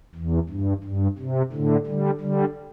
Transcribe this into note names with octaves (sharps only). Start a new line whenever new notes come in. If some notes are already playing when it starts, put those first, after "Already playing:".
E2
G2
G2
C3
A2 D3
D3 G3
D3 G3